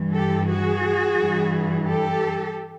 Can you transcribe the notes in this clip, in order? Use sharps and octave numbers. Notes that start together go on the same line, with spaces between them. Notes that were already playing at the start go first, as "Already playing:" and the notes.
Already playing: G2 E3
G4 A4
F#4 G#4
G2 E3
G4 A4